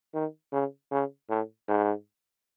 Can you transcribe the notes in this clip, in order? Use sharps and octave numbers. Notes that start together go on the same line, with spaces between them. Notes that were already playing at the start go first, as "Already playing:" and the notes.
D#3
C#3
C#3
A2
G#2